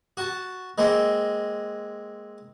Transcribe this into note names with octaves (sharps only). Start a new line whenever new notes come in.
F#4 A5
G#3 A#3 C4